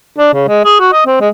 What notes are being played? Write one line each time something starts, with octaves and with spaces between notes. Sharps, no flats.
D4
C#3
G#3
G#4
F#4
D#5
C4
G#3